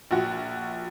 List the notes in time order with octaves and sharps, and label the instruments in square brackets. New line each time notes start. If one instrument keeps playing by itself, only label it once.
[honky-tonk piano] A#1 F#4